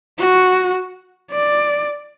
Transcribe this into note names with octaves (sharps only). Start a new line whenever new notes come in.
F#4
D5